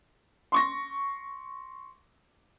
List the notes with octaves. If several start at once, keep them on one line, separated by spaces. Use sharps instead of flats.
C6 C#6 A#6